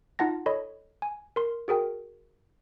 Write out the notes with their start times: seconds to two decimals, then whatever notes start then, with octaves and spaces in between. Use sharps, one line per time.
0.19 D#4 F4 F#5 A5 A#6
0.46 A4 C#5 D#5 B5
1.02 G#5
1.36 A#4 C6
1.68 F#4 G#4 A#4 G5